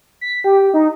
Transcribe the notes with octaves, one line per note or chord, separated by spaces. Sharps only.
B6
G4
D#4